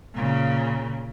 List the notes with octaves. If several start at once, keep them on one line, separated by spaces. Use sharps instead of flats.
A#2 C#3